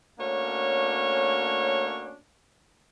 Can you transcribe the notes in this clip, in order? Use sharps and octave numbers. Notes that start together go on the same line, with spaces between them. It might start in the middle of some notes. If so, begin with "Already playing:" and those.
A3 A#3 C#4 D4 F#4 C#5